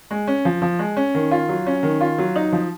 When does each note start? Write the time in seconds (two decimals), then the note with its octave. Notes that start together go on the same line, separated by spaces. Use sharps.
0.11 G#3
0.28 C#4
0.45 F3
0.62 F3
0.79 G#3
0.97 C#4
1.14 D#3
1.31 F4
1.49 F#3
1.66 C#4
1.83 D#3
2.01 F4
2.18 F#3
2.36 D#4
2.52 F3